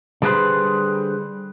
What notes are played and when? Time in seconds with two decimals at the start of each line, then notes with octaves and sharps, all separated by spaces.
0.22 D3 G3 G#4 A4 B4 C5